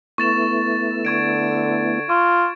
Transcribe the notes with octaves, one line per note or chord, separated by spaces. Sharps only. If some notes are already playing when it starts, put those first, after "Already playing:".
A3 B3 E4 C#6 A6 E7
D3 C#6 G#6 D7
F4 C#6